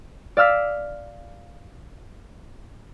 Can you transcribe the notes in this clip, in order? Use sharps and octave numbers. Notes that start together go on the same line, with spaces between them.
D5 F5 E6 F6 B6